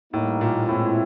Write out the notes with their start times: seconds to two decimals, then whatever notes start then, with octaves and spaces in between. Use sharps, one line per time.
0.12 A2 G3 A#3 D#4
0.41 A#2
0.68 A2 G#3 C4 E4